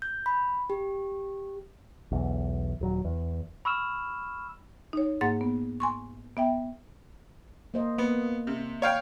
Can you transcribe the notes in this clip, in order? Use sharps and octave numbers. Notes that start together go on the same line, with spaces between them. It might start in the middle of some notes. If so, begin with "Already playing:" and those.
G6
B5
G4
B1 E2
D#1 F#3
E2
B5 C#6 E6 F6 E7
D#4 C#5
G#2 A#3 F#5 A6
B3
G#5 C6 C#6
B3 E5 G5
A#3 C5 D#5
A#3 B3
C3
C#5 F5 G5